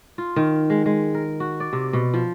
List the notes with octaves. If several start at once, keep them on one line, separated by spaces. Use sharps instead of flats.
F4
D#3
G#3
G#3
A#4
F#4
D5
C3
B2
F3